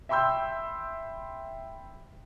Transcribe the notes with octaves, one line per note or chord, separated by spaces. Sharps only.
E5 G5 B5 C6 E6 G6